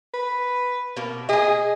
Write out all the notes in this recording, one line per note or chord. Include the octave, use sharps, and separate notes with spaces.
B4
B2 A#3
G#4 D#5 G#5